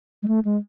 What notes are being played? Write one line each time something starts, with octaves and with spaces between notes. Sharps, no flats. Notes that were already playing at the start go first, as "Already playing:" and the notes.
G#3
A3
G#3